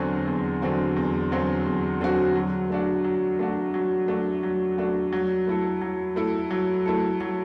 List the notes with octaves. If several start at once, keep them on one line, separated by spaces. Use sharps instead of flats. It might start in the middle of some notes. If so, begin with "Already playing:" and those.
Already playing: E2 D3 F#3 C4 F#4
E2
D3 F#3 C4 F#4
E2
D3 F#3 C4 F#4
E2
D3 F#3 C4 F#4
F#3
A3 D4 F#4
F#3
A3 D4 F#4
F#3
A3 D4 F#4
F#3
A3 D4 F#4
F#3
A3 E4 A4
F#3
A3 E4 A4
F#3
A3 E4 A4
F#3